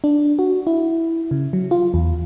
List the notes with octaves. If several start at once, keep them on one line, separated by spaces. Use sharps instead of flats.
D4
F#4
E4
C#3
F#3
F4
E2